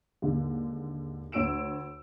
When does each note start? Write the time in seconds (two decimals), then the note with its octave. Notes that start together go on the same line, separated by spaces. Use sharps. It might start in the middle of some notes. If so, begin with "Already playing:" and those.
0.22 D#2 G#2 D3
1.32 D2 C#5 E6 D7 E7